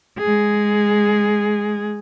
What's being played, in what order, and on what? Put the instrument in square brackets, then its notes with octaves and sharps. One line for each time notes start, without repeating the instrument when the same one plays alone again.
[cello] G#3 G#4